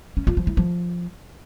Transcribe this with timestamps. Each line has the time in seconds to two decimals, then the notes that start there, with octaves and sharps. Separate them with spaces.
0.17 C#4
0.27 F4
0.37 F3
0.47 E4
0.57 F3